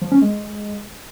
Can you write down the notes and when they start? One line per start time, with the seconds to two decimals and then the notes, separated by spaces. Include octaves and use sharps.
0.02 F3
0.12 C#4
0.22 G#3